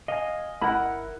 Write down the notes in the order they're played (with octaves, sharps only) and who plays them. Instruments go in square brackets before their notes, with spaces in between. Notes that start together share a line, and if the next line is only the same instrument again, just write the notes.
[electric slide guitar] D#5 G#5 [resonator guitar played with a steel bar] F5
[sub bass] G1 [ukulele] E4 B5 [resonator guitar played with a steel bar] A#4 F#5